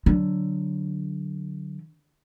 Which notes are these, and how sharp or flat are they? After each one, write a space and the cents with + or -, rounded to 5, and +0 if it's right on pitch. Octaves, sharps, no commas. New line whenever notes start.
D3 +0 F#3 +0